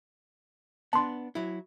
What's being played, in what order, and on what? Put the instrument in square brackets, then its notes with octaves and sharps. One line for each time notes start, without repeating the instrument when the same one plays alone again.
[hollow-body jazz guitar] B3 D4 [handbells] A5 C6
[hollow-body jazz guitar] F#3 E4